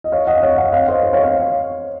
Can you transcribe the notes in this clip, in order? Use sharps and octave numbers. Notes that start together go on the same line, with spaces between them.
D#5
C#5 F5
D#5 F#5
C#5 F5
D#5 F#5
C#5 F5
C5 D#5
C5 D#5
C#5 F5
C#5 F5